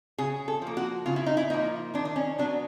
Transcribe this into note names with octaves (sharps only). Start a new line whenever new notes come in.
C#3 G#4
A4
F3
A#3
F#4
C#3 F4
E4
D#4
E4
F3 A#3 D#4
D#3 D4
D4
C#4
F#3 B3 D4